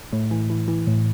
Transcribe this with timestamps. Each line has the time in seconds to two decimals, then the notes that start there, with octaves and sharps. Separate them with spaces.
0.13 A2
0.31 E3
0.50 E3
0.68 E3
0.87 A2